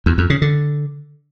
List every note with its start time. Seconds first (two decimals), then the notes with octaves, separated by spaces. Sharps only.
0.06 E2
0.18 F2
0.30 C#3
0.42 D3